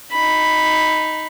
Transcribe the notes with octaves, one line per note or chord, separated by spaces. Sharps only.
D#4 B5